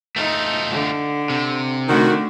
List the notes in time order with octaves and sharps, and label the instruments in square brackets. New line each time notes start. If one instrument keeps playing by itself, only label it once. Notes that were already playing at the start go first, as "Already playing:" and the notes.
[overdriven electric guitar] A3 F4 [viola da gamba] D#4
[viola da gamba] D3
[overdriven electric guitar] C3
[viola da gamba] D3 A3 [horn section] D#3 F#4